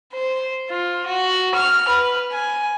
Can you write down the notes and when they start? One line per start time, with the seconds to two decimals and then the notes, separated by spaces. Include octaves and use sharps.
0.13 C5
0.71 F4
1.06 F#4
1.55 F6
1.89 B4
2.32 G#5